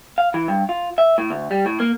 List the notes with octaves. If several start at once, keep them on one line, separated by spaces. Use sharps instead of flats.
F5
E3
G2
F4
E5
A2
D2
G3
A2
A#3